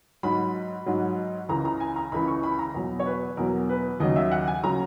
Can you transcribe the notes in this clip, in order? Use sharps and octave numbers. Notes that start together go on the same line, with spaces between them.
G#2 F#3 B5
G#2 F#3
C#2 C#3 E3 A#5
A#5
G#5
A#5
C#2 C#3 E3 B5
C#6
B5
A#5
E2 B2 F#3
C#5
B4
E2 B2 F#3 A#4
B4
D#2 C#3 F#3 D#5
E5
F#5
G#5
C#3 F#3 A#5